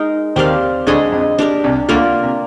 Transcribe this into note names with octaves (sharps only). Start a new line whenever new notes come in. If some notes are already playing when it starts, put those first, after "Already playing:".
Already playing: G#3 D#4 A#4
D#2 D#3 C4 G4 D5 F5
D2 D3 G#3 D4 G#4 D#5
F2
D4 G4 A#4
C2 C3
D2 D3 A#3 F4 A#4 D5
C3